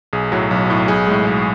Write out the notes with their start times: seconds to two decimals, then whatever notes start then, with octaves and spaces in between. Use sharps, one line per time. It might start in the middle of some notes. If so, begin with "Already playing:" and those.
0.13 B1 G#4
0.32 A2 F#3 F#4
0.51 B1
0.70 A2 F#3
0.88 B1 G#4
1.07 A2 G#3
1.27 B1